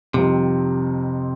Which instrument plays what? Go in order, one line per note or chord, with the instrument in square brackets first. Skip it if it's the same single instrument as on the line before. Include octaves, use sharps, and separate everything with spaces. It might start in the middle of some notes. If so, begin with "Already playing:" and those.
[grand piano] F2 D#3 G3 C4 F4 [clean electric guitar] C3